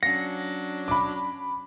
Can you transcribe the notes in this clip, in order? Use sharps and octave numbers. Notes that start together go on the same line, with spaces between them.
F#3 C#4 D4 F5 F#5 A#6
B5 D6